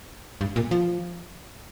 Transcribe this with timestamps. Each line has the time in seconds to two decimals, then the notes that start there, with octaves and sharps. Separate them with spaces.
0.41 G2
0.56 A#2
0.71 F3